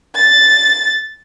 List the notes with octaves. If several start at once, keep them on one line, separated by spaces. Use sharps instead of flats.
A6